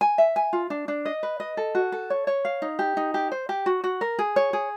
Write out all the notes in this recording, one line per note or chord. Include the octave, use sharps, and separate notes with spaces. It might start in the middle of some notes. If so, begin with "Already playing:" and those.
G#5
E5
G#5
F4
D4
D4
D#5
B4
D#5
A4
F#4
A4
C#5
C#5
F5
D#4
G4
D#4
G4
C5
G4
F#4
F#4
A#4
G#4
C#5
G#4